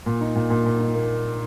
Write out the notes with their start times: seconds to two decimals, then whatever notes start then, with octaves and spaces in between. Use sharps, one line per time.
0.06 A#2
0.21 D#4
0.35 A#2
0.50 A#2
0.65 A#2
0.80 D#4
0.95 A#3